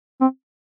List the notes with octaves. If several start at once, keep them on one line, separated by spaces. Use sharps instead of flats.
C4